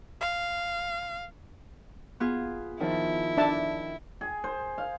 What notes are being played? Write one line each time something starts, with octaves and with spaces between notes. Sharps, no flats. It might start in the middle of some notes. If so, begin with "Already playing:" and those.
F5
B3 F4 G#4
D#3 F3 E4
D4 E5 A5
G#4
C5
F5